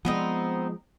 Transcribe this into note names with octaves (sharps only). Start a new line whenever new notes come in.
F3 G#3 B3 C4 D#4